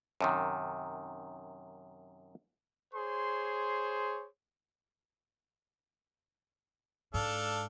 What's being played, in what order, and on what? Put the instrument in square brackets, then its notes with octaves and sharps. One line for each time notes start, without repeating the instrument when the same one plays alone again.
[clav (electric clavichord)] F#2 C3 D#3
[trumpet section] G#4 C5 C#5 C6
[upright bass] G#2 [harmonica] D4 A4 F5